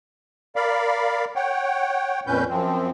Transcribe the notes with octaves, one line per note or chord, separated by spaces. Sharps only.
A#4 D5 F5 B5
C#5 F#5 G5
F2 A#2 C#4 B4 G6
F#2 F3 C4